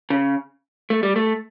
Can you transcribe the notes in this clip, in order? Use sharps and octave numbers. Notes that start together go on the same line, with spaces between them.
C#3
A3
G3
A3